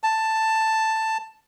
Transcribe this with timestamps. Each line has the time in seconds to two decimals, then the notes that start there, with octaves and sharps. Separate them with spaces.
0.04 A5